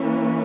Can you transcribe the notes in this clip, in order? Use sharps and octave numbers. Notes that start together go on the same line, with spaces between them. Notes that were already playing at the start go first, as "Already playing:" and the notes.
Already playing: E3 A#3 C#4